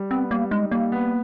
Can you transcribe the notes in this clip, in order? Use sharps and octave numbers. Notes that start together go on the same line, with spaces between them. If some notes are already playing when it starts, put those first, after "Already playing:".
Already playing: G3
B3 C4
G3 A#3
G#3 D#4
G3 A#3
B3